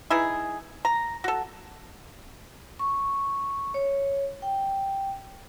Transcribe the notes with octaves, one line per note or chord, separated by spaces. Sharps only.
E3 D#4 E4 G#4
A#5
F#4 A4
C#6
C#5
G5